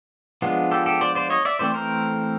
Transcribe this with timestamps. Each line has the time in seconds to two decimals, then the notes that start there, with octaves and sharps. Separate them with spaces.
0.42 F3 G#3 B3 D4 F4
0.71 G4 A4
0.86 G4 A4
1.01 C5 D5
1.15 C5 D5
1.30 C#5 D#5
1.45 D5 E5
1.59 E3 A3 C4 C5 D5
1.74 A#4 C5